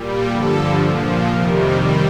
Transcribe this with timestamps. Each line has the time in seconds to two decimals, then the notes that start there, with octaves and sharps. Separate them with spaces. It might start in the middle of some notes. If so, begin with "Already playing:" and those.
Already playing: A#2 G3
0.29 G2 D3 F3 A4
0.78 A#2 F3
1.28 F2 C3 D#3 G3 A#4
1.78 D#3 G3 C5